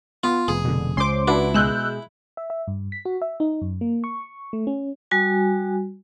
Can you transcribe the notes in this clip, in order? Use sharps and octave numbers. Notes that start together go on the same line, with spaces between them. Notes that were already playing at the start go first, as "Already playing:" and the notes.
B3 F4
F1 G#4
B2 D3
C#2 C#4 C5 C6 D6
D4 E4 F#4 B4
B2 G#3 E6 F#6 G6
E5
E5
G2
B6
F#4
E5
D#4
F#2
A#3
C#6
A3
C#4
G3 F#4 G#5